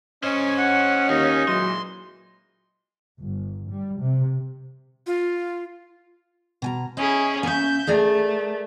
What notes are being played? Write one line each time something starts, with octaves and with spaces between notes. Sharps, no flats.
C#4 C5 D#5
F#5
D#2 D#4 D#5 F5
A#2 E3 F#3 G#3 C6
G1
G3
C3
F4
B2 G#5 A#5
C#4 E4 G#4 D#5
A#3 C#4 E5 G6
A3 G#4 A#4 D5